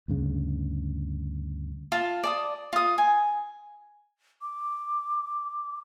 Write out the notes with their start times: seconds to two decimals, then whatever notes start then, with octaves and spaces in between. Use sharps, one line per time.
0.08 D2 G2 C#3
1.92 F4 A5
2.24 D5 A5 D#6
2.73 F4 D#6
2.98 G#5
4.42 D6